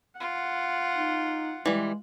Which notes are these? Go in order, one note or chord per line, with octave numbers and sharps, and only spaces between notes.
F4 F#5
D#4
E3 G3 G#3